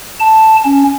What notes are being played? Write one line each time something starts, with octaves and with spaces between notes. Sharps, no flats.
A5
C#4